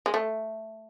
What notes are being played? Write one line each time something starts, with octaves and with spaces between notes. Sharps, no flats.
G#3
A3